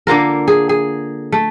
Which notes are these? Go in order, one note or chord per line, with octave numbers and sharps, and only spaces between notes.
D3 A#3 F4 A#4
G#4
G#4
A3